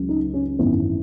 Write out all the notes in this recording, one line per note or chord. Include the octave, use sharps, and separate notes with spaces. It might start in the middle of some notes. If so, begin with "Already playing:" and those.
Already playing: C#2 C#3 F#3
D#4
C#4
G#1 F#2 E3 B3